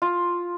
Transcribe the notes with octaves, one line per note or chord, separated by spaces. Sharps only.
F4